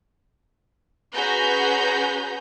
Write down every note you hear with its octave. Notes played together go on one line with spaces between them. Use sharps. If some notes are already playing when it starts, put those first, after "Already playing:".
C#4 F#4 G#4 B4 A#5 G6